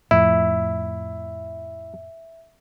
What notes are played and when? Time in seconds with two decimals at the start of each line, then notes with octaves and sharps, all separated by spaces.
0.11 F2 A2 E4 E5